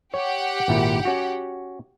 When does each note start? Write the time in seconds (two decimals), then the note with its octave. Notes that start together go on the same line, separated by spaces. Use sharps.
0.14 G4 C#5 F#5
0.68 G#1 A#2 E4
1.05 C#4 F#4